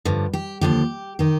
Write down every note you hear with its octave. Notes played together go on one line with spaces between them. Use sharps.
G2 D3 F3
G4
D#2 D3 F3 G4
D#3 G4